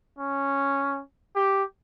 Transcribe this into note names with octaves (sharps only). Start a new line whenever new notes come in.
C#4
G4